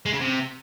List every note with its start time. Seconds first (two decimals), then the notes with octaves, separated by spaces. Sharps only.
0.06 G#3
0.13 C#3
0.20 C3